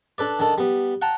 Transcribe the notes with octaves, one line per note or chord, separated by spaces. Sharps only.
D4 A4 B4 D5
D#3 D4 A4
G3 B3
F#5 G5 A5 A#5